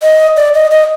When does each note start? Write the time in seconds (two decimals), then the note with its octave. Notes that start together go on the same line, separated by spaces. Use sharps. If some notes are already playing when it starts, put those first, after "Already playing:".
0.02 D#5
0.36 D5
0.54 D#5
0.71 D#5